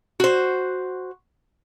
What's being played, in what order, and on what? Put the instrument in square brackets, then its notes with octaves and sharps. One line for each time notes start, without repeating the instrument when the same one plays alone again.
[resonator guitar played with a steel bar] F#4 C5